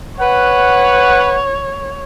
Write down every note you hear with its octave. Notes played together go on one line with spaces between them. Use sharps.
B4 C#5 F#5